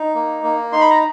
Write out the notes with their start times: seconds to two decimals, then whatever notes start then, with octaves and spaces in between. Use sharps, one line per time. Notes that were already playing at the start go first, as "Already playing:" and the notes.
Already playing: D#4
0.15 A#3
0.44 A#3
0.72 D#4 C6
0.81 B5
0.90 A#5